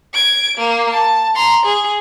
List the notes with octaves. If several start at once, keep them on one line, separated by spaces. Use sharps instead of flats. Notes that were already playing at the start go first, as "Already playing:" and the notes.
G#6 D7
A#3
A5
A#5 C6
G#4